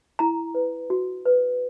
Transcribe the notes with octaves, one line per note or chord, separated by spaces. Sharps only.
E4 A#5
B4
F#4
B4